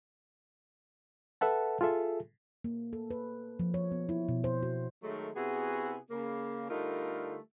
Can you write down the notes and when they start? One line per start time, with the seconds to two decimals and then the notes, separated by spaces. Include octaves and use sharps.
1.41 A4 B4 E5 F#5 A5
1.81 F4 G#4 A4 E5
2.64 A#3
2.93 A4
3.11 B4
3.59 F3
3.74 C#5
3.92 B3
4.09 E4
4.29 B2
4.44 C5
4.63 F#4
5.03 D#3 F#3 G#3 A3
5.36 C3 B3 E4 F#4 G#4
6.11 C#3 A#3
6.70 D3 G3 A3 D#4 F4 A#4